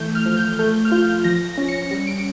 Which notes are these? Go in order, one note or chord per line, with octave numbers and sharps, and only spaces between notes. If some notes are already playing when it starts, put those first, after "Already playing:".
Already playing: E3 A3 G6
F6
F3
G6
A3 G6
F6
F4 G6
F3 A#6
C#4 A#6
C#7
G3 C#7
D7